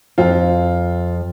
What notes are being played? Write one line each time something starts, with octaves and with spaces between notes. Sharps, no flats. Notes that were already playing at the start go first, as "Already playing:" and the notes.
F2 F4